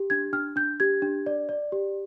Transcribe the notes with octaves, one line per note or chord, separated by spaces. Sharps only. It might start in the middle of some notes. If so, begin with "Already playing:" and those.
Already playing: G4
D4 G#6
D4 F6
D4 G6
G4 G#6
D4
D5
D5
G4